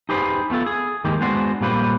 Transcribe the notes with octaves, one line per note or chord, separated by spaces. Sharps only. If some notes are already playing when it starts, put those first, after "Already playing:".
D#4 G4 G#4 B4 C5
A3 B3 F4 A4
G#4
D#3 G#3 A#3 G4
G#3 B3 D4 F#4 C5
A#2 G3 A#3 B4 C5